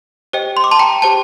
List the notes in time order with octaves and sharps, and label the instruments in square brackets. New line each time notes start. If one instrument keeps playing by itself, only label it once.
[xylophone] G4 C5 D#5 G5
C6
D6
A5 C6
G5 A#5
G4 C5 G5 A5